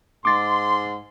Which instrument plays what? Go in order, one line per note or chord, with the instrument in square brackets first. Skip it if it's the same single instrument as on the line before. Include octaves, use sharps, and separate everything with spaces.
[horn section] G#2 C6 [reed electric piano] D6 A6